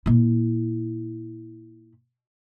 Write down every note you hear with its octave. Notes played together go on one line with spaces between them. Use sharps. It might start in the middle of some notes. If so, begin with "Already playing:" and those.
A#2 E4